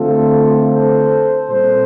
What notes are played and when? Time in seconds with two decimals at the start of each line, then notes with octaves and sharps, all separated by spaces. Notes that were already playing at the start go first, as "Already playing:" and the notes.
Already playing: D3 A3 C4 F4 A4
0.69 A4 C5
1.50 A#2 G3 C4 A4 C5